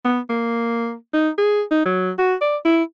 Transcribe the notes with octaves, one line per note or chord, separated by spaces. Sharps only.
B3
A#3
D#4
G#4
D#4
F#3
F#4
D5
E4